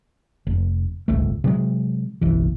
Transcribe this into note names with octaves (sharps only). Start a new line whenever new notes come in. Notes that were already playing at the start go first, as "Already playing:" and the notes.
F1
D1 G1 C#2 A3
C3 F#3 G#3
F#1 B1 E3